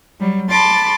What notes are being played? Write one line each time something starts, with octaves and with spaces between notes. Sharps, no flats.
F#3 G3
A5 B5 C6 D6 A6